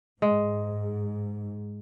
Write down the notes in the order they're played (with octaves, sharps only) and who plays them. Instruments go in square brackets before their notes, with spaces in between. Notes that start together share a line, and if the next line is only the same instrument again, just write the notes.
[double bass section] G#2 [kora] G#3